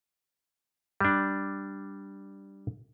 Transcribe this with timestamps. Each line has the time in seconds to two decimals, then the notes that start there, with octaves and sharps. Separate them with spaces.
1.00 G3 D4